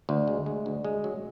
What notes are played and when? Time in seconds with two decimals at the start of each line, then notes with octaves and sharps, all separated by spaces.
0.09 D2
0.28 G#3
0.46 G#3
0.66 D2
0.85 G#3
1.04 F#3